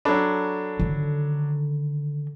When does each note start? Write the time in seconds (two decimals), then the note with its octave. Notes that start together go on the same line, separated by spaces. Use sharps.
0.05 F#3 D4 A4 A5 B5
0.80 D3 D#3